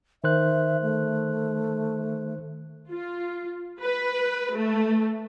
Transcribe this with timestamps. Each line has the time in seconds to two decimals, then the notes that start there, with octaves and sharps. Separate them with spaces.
0.24 D#3 C5 E5 F#6
0.82 A3
2.90 F4
3.81 B4
4.55 A3